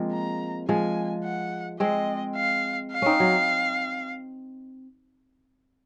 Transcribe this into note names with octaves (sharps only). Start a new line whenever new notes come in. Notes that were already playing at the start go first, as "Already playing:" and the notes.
Already playing: F3 G#3 A#3 C4
A#5
F3 G#3 G#5
F#5
G#3 C4 D#5
F5
F5
C4 C#4 D#4
F#3